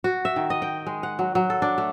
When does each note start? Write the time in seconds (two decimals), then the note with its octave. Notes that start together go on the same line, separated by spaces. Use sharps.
0.04 F#4
0.25 E5
0.36 D#3
0.50 D#5
0.62 G5
0.87 G#3
1.03 F#5
1.19 F#3
1.35 F#3
1.50 A4
1.62 D4
1.78 A3